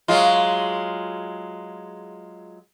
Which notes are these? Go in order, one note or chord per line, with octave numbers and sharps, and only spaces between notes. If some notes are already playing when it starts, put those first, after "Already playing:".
F#3 G#3 F4